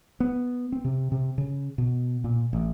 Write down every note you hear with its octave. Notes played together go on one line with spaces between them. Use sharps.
B3
C4
C3
C3
C#3
B2
A#2
A1